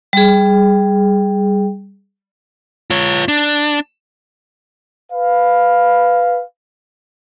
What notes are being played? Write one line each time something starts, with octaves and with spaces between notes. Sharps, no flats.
G3 G#4
F4 C#5
D4
B4 F5